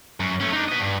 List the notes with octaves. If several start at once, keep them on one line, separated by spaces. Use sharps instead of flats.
F#2
A3 C#4
D4 D#4
B4 D#5
G2